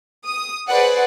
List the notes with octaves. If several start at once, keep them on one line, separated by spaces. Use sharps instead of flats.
D#6
G#4 B4 C5 D5 F#5